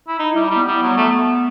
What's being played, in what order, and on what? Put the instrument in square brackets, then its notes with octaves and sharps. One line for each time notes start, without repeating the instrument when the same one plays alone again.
[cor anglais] E4
D#4
[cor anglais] G3 [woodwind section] E4
[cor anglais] G3 [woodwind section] B3
[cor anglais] G3
F#3
A3